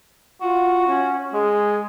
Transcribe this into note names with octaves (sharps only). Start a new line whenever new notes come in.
F4 F#4
C#4
G#3 G#4